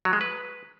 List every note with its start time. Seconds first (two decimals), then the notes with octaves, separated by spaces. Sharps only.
0.05 F#3
0.13 G#3
0.21 B4